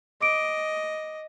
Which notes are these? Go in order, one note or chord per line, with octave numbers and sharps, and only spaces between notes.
D#5 D6 D7